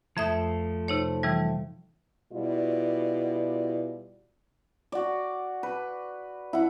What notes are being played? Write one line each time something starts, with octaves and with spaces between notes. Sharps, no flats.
F2 F3 A3 E5 D#6
C3 D#4 C#5
C3 E3 G3
B2 G3 E4 F4 D5
F#4 D5
B4
E4 F#5